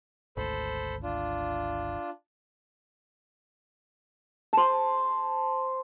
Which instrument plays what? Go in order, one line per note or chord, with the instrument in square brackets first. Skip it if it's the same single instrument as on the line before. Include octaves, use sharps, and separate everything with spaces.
[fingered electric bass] G#1 D2 [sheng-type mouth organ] A4 C5 B5
[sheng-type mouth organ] D4 F4
[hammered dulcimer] C5 A5